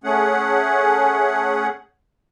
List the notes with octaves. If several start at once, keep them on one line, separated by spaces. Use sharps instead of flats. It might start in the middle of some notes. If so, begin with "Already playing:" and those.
A3 C#4 G#4 F#5